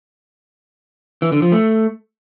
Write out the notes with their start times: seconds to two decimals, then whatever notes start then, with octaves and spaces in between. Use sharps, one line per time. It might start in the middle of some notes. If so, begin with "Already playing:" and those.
1.22 E3
1.32 D3
1.42 F3
1.52 A3